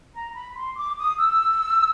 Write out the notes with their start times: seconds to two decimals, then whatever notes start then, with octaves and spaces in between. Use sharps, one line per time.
0.14 A#5
0.35 B5
0.55 C6
0.76 D6
0.97 D#6
1.18 E6